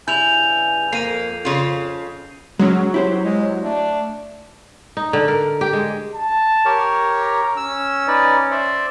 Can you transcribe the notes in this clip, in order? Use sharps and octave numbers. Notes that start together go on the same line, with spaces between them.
G2 C#3 E4 G#5 G6 F7
F2 A#3 C7 D#7
C#3 F4
F#3 G#3 C#4
E4 G4 C5 C#5
G#3
A3 D4
D#4
D3
A#4
G4
G#3
A5
G4 A#4 C#5
A#5
C#4 E6
D#4 B4 D5
C5 D5 E5